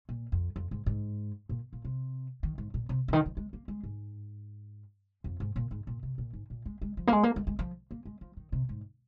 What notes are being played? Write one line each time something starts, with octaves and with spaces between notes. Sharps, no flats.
A#2
F2
F2
G#2
G#2
A#2
A#2
C3
D#3
G#2
A#2
C3
C3
D#3
F3
G#3
A#3
G#3
G#2
F2
G#2
A#2
G#2
A#2
C3
A#2
G#2
A#2
G#3
G#3
F3
A#3
G#3
A#3
G#3
G#3
F3
A#3
G#3
F3
D#3
C3
G#2